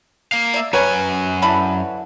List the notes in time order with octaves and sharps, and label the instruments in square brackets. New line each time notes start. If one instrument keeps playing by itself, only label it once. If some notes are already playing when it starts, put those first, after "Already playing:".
[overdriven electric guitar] A#3 F5
[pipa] D5 E5
[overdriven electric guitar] F#2 G#5 [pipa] G3 C#4 A#4 [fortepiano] B4 C#5
[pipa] D3 E3 B5